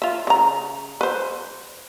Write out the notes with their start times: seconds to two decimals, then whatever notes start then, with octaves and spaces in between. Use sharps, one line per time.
0.02 F4 E5
0.27 C#3 A#5
1.01 B4 C5